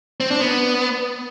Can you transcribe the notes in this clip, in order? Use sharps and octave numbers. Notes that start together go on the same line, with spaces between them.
C4
D4
B3